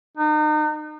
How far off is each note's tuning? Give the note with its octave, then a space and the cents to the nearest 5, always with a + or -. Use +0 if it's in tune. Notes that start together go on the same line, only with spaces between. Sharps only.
D#4 -35